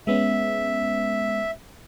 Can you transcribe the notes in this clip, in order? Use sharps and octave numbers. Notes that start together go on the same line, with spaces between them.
G#3 B3 C#4 E5